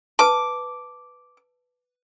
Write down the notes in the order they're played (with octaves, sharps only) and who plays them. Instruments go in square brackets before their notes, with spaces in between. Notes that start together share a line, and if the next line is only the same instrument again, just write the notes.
[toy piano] B4 A5 [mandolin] D6